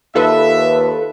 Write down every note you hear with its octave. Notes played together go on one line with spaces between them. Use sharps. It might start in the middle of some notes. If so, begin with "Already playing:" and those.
D#2 F4 A4 B4 E5